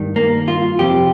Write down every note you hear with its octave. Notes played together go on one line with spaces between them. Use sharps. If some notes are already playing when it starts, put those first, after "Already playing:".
Already playing: G2 D#3
A#3
F4
F2 C3 F3 G4